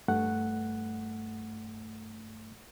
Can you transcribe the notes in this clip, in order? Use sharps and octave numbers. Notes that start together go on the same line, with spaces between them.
G2 A3 F#5